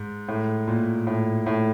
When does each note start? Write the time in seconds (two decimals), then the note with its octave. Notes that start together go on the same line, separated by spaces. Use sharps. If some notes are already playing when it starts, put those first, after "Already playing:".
Already playing: G#2
0.28 A2
0.68 A#2
1.07 A2
1.46 A2